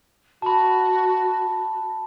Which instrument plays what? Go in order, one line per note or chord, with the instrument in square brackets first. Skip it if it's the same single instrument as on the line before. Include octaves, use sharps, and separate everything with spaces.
[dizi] F#4 [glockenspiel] A5 B5